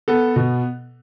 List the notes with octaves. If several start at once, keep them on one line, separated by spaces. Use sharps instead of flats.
B3 A4
B2